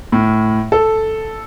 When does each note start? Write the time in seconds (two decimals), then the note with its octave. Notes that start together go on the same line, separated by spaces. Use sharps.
0.12 A2
0.72 A4